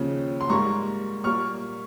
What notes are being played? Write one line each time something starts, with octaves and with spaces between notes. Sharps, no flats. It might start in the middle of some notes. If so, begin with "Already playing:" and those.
Already playing: D#2 C#3 F3
C6
G#2 G3 A#3 A#5 C#6
A#2 G3 A#3 C#6 F6